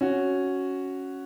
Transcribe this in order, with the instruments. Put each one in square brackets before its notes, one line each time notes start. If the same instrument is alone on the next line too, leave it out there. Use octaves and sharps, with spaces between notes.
[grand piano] C#4 F#4